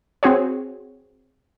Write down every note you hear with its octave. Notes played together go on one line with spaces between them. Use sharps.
C4 F#4 G#4 C#5